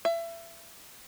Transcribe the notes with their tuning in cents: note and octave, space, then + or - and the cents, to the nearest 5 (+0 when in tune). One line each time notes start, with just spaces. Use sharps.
E5 +30